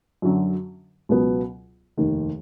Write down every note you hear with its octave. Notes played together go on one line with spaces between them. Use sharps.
F#2 D3 F#3
C#2 B2 F#3 B3
F1 D#2 D#3